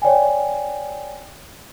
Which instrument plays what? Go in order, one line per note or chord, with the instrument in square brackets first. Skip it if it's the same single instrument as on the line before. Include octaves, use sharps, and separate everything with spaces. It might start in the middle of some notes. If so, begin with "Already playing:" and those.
[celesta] C#5 D5 G5 G#5